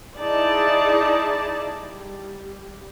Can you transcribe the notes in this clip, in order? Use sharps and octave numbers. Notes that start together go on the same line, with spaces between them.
D#4 E4 G#4 D5 A5
G3